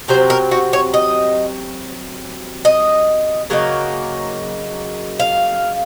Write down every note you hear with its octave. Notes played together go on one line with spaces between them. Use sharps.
C3 F#3 C4 C5
A#4
F#4
C#5
D#5
D#5
C#3 F#3 A#3 D#4
F5